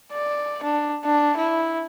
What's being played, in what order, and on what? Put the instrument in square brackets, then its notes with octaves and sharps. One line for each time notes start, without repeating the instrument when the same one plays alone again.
[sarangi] D5
D4
D4
E4